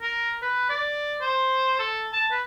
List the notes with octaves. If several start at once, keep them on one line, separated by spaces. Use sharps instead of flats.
A#4
B4
D5
C5
A4
A5
B4